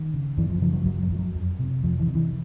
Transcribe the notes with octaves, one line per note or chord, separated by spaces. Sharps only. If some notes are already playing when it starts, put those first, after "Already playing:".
Already playing: D#3
C#3
F#2 E3
F3
C#3 F3
F#3
F#2 F#3
F#3
F#2 F3
F#3
F2
C3
F2 F3
E3
C3
E3